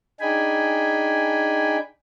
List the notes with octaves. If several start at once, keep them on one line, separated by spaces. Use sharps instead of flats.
D4 D#4 G#4 G5 G#5 B5